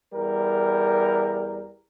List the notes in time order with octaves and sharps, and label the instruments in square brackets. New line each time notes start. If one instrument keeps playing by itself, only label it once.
[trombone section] E2 G3 A#4